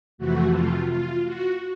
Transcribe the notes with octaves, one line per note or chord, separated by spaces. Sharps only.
F2 C3 E3 A3 F#4
F4
F4
F#4